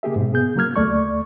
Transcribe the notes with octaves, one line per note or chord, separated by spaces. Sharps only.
C#3 A#3 G4 G#4 E5
G#2 B2
B3 G#4 G6
C#3 F#3 A#3 F6 G#6
D2 A3 D5 C#6